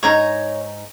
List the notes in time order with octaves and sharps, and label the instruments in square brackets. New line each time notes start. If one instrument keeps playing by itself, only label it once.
[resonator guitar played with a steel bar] G#2 D#4 [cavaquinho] C#5 A#5